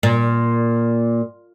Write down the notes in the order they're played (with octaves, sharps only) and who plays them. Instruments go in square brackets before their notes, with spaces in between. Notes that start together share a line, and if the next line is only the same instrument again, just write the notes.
[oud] A#2